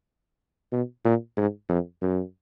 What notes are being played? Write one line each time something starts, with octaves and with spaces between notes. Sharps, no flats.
B2
A#2
G#2
F2
F#2